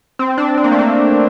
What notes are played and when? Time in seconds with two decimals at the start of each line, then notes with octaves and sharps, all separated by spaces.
0.19 C4
0.38 D4
0.57 C4
0.64 A#3
0.72 A3
0.79 A#3